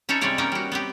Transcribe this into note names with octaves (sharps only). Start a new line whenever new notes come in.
C#4 D#4 E4 A4 C#5
C3 G3 G#3 C#4 C#5 D5
A#3 B3 C#4 D#4 A#4
G3 F#4
B3 C4 G4